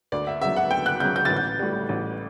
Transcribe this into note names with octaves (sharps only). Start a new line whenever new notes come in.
D2 D5
E5
C#3 F#3 E5
F#5
D2 G5
F#6
C#3 F#3 G6
G6
A1 A6
G6
A2 G3
A1